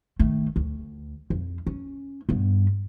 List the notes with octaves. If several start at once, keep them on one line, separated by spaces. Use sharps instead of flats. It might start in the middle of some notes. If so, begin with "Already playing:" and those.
D#3 A3
D2
F2
C#4
G2 B3